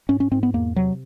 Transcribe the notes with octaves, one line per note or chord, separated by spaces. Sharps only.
G#2 C#4
C#4
G#2 C4
B3
E2 A#3
C3 F#3